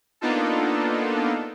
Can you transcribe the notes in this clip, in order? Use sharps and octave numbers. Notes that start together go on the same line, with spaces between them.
A#3 B3 D4 D#4 F4 A4